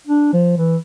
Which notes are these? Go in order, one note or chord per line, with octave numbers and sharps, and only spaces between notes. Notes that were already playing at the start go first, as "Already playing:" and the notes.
D4
F3
E3